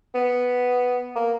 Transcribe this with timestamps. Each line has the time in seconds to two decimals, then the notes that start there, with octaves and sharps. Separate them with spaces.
0.14 B3
1.16 A#3